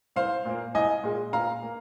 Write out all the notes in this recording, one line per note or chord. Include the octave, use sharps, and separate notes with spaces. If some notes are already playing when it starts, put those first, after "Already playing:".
C2 C5 F5
A#2 A#3
C2 D#5 G#5
A#2 G#3
A#2 F5 A#5
A#3